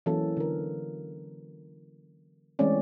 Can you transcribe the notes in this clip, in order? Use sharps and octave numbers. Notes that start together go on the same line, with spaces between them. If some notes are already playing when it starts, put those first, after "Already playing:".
E3 F#3 A#3 C#4 A4
D3 A#4
E3 G#3 A3 C4 C#4 D5